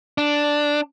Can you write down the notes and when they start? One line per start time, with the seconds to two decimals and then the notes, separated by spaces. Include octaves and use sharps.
0.18 D4